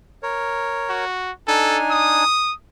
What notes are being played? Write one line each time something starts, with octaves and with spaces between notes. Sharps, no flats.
A#4 C#5
F#4
D4 D#4 A4 G#5
D#6